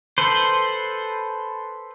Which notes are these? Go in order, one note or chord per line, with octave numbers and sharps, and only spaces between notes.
A4 B4 C5